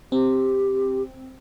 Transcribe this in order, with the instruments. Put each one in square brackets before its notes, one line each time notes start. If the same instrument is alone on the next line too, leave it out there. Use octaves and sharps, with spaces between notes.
[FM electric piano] C4 [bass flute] G4